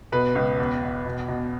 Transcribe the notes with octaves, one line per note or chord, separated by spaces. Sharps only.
B2 B4
C#2
E2
E2
B2
B2